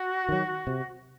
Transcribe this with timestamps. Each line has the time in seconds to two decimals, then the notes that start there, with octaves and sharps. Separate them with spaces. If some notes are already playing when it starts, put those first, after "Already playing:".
Already playing: F#4
0.29 D#3 F#3
0.67 C3